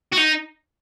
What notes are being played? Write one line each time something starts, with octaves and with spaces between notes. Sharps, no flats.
F#4
D#4